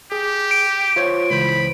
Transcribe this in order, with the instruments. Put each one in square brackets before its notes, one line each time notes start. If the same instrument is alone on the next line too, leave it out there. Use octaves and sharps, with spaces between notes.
[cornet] G4 [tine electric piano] G#4
[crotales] D7
[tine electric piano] F4 C5 C#5
[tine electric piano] C#2 E3 C5 [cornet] B5